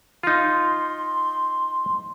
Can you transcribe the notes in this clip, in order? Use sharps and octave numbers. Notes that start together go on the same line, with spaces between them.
D#4 F4 C6